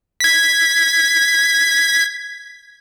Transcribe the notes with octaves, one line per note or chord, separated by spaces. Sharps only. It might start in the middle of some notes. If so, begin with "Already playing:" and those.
G#6 B6